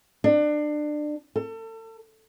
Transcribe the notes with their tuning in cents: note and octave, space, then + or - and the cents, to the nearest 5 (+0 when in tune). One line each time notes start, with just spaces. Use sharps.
D4 +25
A4 +35